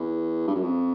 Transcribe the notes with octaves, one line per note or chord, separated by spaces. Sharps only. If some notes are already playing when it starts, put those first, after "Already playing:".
Already playing: E2
G2
F#2
F2